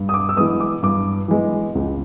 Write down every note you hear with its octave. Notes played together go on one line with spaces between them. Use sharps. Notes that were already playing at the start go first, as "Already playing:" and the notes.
Already playing: G2
D#6
D6
E6
E3 G#3 B3 D#6
D6
G2 D6
E3 G#3 B3
C#2